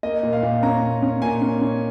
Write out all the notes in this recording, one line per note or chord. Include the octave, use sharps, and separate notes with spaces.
A#3 D#5
A#2
F5
A#2
C#4 A#5
A#2
C#4
A#2 G#5
C#4
C#4